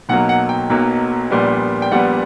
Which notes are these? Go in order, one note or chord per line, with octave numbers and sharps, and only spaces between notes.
B1 B2 F#3 A#3 F#5
F#5
G5
B1 B2 F#3 A#3
A#1 A#2 G3 B3
G5
A#1 A#2 G3 B3 F#5